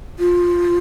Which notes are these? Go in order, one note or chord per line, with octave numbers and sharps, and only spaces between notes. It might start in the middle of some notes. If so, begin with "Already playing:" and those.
F4